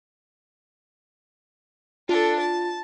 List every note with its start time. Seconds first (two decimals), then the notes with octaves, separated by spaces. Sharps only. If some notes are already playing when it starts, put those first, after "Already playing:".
2.09 D4 F4 A4
2.40 A5